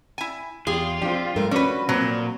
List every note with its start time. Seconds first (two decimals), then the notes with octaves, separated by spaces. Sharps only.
0.18 E4 G#5
0.67 E2 F4 G4 G#4
1.02 F3 C4 D4 G4
1.36 G2 A3 A#4
1.51 F3 C#4 D4 F#4 B4
1.89 A#2 F#3 A#3 C4